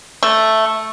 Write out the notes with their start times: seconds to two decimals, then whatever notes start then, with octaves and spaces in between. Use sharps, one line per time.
0.23 A3